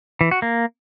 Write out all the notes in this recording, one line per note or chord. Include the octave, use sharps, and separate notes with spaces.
E3
F#4
A#3